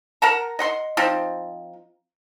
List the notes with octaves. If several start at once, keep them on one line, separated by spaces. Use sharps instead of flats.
A#4 F#5 A5 A#5
D#5 F#5 C6
F3 C4 D#4